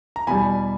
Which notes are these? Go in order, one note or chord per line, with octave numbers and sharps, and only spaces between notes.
A#5
E2 B2 G3 G#5 B5